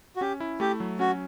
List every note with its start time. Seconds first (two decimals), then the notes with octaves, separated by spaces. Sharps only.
0.16 F#4
0.21 C#4 G4
0.40 E4
0.60 A3 G4
0.80 F#3
0.99 C#4 F#4